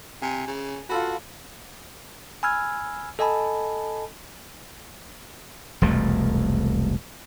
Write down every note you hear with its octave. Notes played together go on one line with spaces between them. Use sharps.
C3 G#5
C#3
F4 F#4 A4 B4
G#5 B5 E6 F6 G#6
A4 D#5 G#5 A5 B5
E1 C2 F2 A3